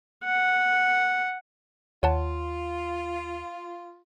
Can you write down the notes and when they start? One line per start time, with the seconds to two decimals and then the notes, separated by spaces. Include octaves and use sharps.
0.24 F#5
2.03 D#2 F4 C#5 F#5 A5